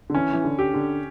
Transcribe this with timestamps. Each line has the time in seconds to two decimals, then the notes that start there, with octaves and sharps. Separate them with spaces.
0.10 D3
0.15 E3 C#4
0.33 E3
0.44 D3
0.59 G4
0.74 D3